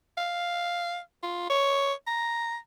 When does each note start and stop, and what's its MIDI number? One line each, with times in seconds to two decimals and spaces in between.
0.17 0.99 77
1.23 1.48 65
1.50 1.93 73
2.07 2.57 82